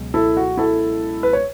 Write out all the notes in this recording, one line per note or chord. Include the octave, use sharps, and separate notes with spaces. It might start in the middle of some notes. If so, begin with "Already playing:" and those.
Already playing: C#2 B2 F#3
E4 A4
F#4
E4 A4
B4
C#5